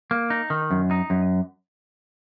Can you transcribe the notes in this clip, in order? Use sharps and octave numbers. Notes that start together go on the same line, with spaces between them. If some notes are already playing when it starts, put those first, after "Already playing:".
A#3
D#4
D#3
F#2
D#4
F#2